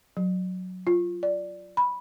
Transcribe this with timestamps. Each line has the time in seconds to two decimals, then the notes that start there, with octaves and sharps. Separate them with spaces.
0.17 F#3
0.87 F4
1.23 D5
1.77 B5